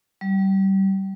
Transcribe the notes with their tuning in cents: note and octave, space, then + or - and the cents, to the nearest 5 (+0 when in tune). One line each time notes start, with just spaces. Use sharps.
G3 -25